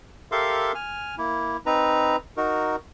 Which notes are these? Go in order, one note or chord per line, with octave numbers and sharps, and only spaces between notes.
G4 A4 A#4 E5 F5 C6
G#5 F6
A#3 E4
C4 D#4 B4 A#5
D#4 F#4 A#4